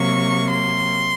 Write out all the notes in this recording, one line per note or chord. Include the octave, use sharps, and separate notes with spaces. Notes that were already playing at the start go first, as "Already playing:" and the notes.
Already playing: C3 F#3 A#3 C#6
C6